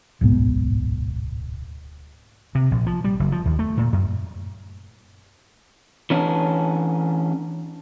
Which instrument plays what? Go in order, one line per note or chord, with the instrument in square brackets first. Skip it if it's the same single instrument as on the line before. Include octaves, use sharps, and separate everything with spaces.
[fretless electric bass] D1 B1 G#2 B3
[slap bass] C3
A#1
F3
G3
F#1
F3
D#2
A3
A#2
F#2
[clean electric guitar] E3 C#4 D4